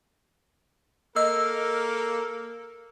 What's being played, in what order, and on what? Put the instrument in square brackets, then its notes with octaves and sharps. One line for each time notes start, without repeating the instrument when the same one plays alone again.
[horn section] A#3 A4 A#4 [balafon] D#5 [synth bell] E6